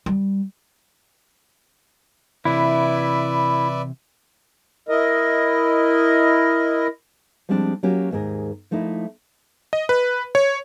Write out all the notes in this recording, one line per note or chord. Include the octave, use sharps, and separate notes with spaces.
G3
C3 E3 E4 B4 D5 E5
E4 A#4 D#5
F3 G3 G#3 C4 D4
F#3 A#3 C#4 F#4 G4
D#2 G#2 G#4 A#4
F3 A3 A#3 D#4 E4
D#5
B4
C#5